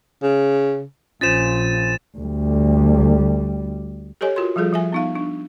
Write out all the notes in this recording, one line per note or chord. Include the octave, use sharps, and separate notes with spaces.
C#3
A#1 C#4 F4 C5 A6 D#7 E7
D2 G3
G4 A4 C#5 D#5 G#5
F4 F#4 A#4 C6
F3 G3 F4 G#4 A4
F3 E5 G#5
B3 D#4 F5
D4